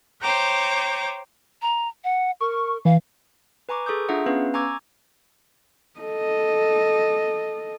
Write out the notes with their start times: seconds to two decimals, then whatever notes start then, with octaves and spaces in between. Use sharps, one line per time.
0.22 C5 C#5 G5 A#5 D6
1.62 A#5
2.04 F#5
2.41 A#4 C#6
2.85 E3 F5
3.69 B4 G#5 A#5 C#6 D6
3.86 G#4 A4 C#6 D#6 G6
4.09 D4 F4 G#4 E5 F#5 A#5
4.26 B3 C#4 B4 F5
4.54 G#5 A#5 C#6 D6 E6 G#6
6.00 A4 D#5